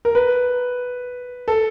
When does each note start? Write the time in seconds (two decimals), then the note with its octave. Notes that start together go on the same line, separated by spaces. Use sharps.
0.05 A#4
0.15 B4
1.48 A4